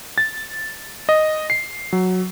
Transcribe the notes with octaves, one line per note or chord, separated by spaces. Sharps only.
A6
D#5
C7
F#3